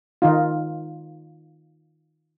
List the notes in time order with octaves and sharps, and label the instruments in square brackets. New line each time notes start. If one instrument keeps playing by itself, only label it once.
[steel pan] D#3 D#4 F4